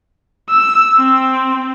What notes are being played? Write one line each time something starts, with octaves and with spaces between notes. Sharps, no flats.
E6
C4